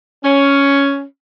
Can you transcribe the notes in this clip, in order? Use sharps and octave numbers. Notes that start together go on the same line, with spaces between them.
C#4